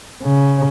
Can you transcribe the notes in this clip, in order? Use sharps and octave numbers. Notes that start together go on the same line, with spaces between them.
C#3